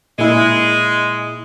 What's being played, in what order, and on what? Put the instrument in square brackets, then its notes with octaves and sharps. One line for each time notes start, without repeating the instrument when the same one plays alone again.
[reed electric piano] A#2 E4 [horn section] G#3